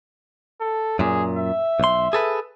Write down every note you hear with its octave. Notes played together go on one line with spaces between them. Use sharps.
A4
F#2 A#2 G#4
E5
B1 C6
G#4 A4 B4